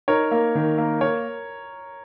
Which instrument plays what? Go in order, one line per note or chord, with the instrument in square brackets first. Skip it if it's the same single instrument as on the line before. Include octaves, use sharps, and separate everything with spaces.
[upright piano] D#4 [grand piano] A#4 C#5
[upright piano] A#3
D#3
A#3
[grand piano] A#4 C#5